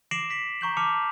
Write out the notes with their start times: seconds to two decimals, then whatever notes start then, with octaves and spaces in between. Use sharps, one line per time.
0.11 D6 A#6 C7 D7 E7 F#7
0.30 B6 D7 F#7
0.61 A#5 C#6 G6 F#7
0.77 A5 D6 F6 C#7 F7